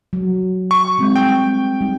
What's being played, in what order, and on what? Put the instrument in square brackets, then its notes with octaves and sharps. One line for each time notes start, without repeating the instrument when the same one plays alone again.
[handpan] F#3
[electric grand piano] C#6
[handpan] G3 G#3 C4
[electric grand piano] G5
[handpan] G3 D#4